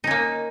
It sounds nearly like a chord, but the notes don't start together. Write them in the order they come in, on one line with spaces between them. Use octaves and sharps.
D#4 C#4 A#3